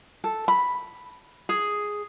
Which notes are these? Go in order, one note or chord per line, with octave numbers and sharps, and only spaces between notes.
A4
B5
G#4